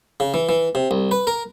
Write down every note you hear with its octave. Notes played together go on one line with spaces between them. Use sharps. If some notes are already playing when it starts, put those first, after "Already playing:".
C#3
E3
E3
C3
C2
B4
A#4